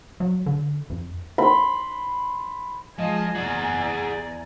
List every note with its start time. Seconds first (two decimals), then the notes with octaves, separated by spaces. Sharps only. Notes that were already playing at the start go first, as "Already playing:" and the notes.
0.20 F#3
0.46 D3
0.90 F2
1.38 B5 C6
2.99 F3 G#3 D#5 G#5 A#5
3.35 E2 G#4 D5 F#5